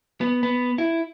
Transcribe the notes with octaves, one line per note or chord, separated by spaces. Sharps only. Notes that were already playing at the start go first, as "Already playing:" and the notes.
B3
B3
E4